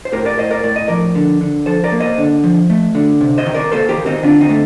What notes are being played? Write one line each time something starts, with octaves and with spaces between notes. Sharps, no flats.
C5
A2 G4 A#4
A#4 D5
A2 C5 D#5
A#4 D5
A2 D5
D#5
F3 A#4 D5
D3
D3
F3 A4 C5
A#4 D5
A#3
C5 D#5
D3
F3
A3
D3
C3
C5 D#5
D#3
A#4 D5
A#3 A4 C5
G4 A#4
D#3
C4 D#4
D3 D4 F4
C4 D#4
A3